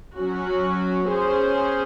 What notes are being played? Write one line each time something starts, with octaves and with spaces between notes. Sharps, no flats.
F#3 C#4 F#4
C#4 G#4 C5